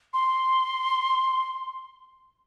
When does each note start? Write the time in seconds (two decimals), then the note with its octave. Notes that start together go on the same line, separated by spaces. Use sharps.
0.13 C6